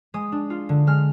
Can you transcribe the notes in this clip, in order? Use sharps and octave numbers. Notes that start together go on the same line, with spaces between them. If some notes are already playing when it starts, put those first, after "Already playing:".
G#3 D#6
D4
F4
D3
G#3 F6